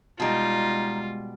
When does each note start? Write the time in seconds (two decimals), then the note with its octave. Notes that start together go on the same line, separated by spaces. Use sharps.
0.20 B2 G3 G#3 D#4 F4